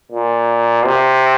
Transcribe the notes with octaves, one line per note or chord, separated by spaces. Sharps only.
A#2
C3